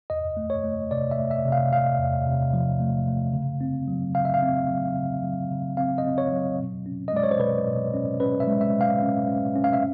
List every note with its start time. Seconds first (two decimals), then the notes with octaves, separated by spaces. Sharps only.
0.10 E2 D#5
0.37 A3
0.50 C#5
0.64 A3
0.91 C3 D5
1.11 E5
1.18 A3
1.31 E5
1.45 C3
1.52 F5
1.72 C3 F5
1.99 E2
2.26 C3
2.54 F3
2.80 A3
3.08 A3
3.34 C#3
3.61 C4
3.88 F#3
4.15 C#3 F5
4.25 E5
4.34 F5
4.43 C4
4.70 F#3
4.96 C#3
5.23 F#3
5.51 C#3
5.77 C4 F5
5.98 D#5
6.04 C4
6.18 C#5
6.32 F#3
6.59 B2
6.86 C#4
7.08 D#5
7.13 G#3 D5
7.24 C#5
7.31 C5
7.39 B2 B4
7.67 B2
7.94 C#4
8.20 C#4 B4
8.40 E5
8.47 G#3
8.61 E5
8.75 B2
8.81 F5
9.02 C#4
9.29 C#4
9.55 C#4
9.64 F5
9.73 E5